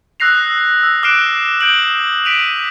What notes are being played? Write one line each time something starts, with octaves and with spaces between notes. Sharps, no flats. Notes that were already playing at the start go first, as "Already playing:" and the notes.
D#6 E6 F#6 A#6 C7 F7
E6
D6 F6 F#6 C7 D7 E7
D#6 G6 D7 F#7
B6 D7 D#7 F7